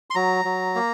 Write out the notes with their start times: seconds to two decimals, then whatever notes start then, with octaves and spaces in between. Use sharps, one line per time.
0.10 C6
0.15 F#3 A#5
0.45 F#3
0.75 A#3